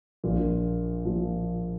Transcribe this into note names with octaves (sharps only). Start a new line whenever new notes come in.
A#1 A#2 F3
A#2 F3